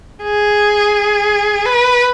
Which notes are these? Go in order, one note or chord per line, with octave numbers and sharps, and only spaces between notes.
G#4
B4